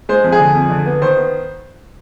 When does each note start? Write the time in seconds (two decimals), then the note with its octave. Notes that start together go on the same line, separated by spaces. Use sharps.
0.09 G#3 C5
0.24 F2
0.32 G#4
0.40 D3
0.55 F2
0.70 D3
0.86 B3
1.02 D#3 C5
1.17 B3